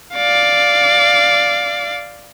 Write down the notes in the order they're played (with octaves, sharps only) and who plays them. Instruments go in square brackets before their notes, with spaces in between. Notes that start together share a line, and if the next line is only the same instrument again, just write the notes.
[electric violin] D5 F5